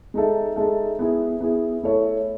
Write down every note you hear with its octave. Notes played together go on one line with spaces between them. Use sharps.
G#3 D#4 A4 E5
G#3 D#4 A4 E5
B3 E4 G#4
B3 E4 G#4
A3 E4 A4 C#5 E5